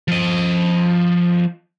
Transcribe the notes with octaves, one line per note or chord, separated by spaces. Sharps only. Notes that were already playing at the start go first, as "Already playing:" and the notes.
F3 D#5